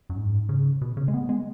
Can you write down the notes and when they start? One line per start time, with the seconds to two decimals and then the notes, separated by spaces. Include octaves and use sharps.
0.10 F#2
0.17 G#2
0.49 C#3
0.81 B2
0.97 C#3
1.08 G#3
1.14 B3
1.29 G#3